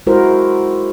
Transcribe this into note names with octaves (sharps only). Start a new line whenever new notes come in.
G#3 E4 F#4 A#4 C5